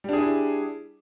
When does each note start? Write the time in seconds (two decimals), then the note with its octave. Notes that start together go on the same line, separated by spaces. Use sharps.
0.04 G3
0.09 D4
0.13 G#4
0.18 E4